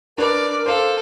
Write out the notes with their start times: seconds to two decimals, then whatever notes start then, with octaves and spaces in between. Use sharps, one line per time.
0.18 D4 A#4 B4 D5
0.66 A4 C5 F5